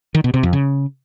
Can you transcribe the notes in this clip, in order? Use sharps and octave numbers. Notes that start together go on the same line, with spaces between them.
D#3
B2
C3
F2
C#3